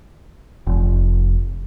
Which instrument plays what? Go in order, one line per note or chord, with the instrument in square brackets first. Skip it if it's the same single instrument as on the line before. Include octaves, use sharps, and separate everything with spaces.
[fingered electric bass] F1